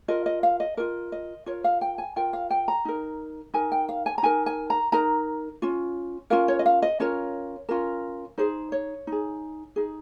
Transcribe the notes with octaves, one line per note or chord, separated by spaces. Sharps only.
F4 A#4 D#5
D#5
F5
D#5
F4 A#4 D#5
D#5
F4 A#4 C#5
F5
G5
G#5
F4 A#4 G5
F5
G5
A#5
D#4 A#4
D#4 A#4 G#5
G5
F5
G#5
A#5
D#4 A#4 G#5
G#5
A#5
D#4 A#4 A#5
C#4 F4
C#4 F4 A#4 F5
C#5
D#5
F5
D#5
C#4 F4 A#4 C#5
C#4 F4 A#4
D#4 G#4 C5
C#5
D#4 G#4
D#4 G#4